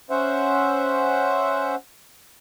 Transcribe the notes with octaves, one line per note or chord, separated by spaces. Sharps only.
C#4 C5 E5 F#5